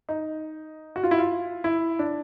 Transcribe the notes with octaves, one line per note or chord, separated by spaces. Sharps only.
D#4
F#4
F4
E4
F4
E4
D4